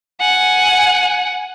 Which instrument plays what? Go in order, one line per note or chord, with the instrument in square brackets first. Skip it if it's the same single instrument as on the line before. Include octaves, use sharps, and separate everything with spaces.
[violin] F#5 G#5